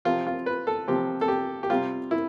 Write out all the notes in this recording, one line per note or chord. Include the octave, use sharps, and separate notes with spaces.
C3 F3 C4 F4
F4
B4
A4
C3 F3 C4 G4
A4
G4
G4
C3 G3 C4 F4
E4